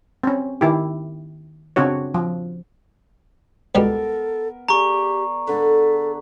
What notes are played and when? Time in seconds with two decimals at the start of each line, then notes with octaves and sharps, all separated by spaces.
0.24 C4 C#4
0.61 D#3 E4 G4
1.76 C#3 C4 D4 F#4 C#5
2.14 F3
3.75 C#2 B2 G3 B3 A4 A#4
4.68 G4 G#4 D5 A#5 C#6
5.47 D3 A4 B4